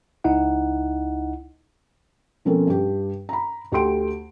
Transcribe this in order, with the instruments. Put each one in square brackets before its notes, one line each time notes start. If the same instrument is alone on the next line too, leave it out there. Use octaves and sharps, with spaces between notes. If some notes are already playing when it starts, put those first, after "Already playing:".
[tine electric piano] C#2 D#4 E4 F#5
[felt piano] B2 F3 C4 C#4 A4 A#4
G2 G4
A#5 B5
D2 G4 A4 G5 C6 D7